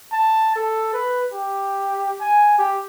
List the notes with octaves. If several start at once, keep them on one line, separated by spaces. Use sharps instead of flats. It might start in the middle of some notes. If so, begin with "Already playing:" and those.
A5
A4
B4
G4
G#5
G4